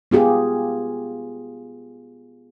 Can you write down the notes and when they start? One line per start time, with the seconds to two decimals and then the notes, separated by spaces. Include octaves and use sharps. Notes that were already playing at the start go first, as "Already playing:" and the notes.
0.11 B3 F4 G4 G#4